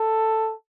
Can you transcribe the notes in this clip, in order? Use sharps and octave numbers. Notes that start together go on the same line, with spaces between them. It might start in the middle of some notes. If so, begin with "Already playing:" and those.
Already playing: A4